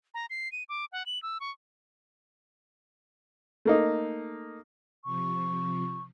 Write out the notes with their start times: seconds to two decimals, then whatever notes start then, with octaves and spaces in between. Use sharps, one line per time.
0.14 A#5
0.30 C7
0.52 D#7
0.69 D6
0.92 F#5
1.06 F#7
1.23 E6
1.40 C#6
3.65 A3 A#3 D#4
5.05 C3 F3 C#6